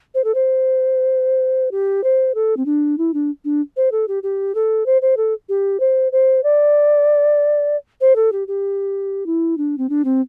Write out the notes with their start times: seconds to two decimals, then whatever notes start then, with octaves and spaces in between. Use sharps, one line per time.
0.15 C5
0.24 A4
0.35 C5
1.71 G4
2.04 C5
2.35 A4
2.57 C4
2.66 D4
2.98 E4
3.14 D4
3.45 D4
3.77 C5
3.92 A4
4.08 G4
4.23 G4
4.55 A4
4.86 C5
5.02 C5
5.17 A4
5.49 G4
5.80 C5
6.12 C5
6.43 D5
8.01 C5
8.16 A4
8.32 G4
8.48 G4
9.26 E4
9.58 D4
9.78 C4
9.89 D4
10.05 C4